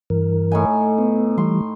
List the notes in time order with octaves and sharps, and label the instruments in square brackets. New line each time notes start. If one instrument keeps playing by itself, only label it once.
[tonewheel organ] G2 E3 A#4
[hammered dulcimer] A2 D#4 G#5
[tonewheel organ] B3
[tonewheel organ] E3 G3 [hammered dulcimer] C6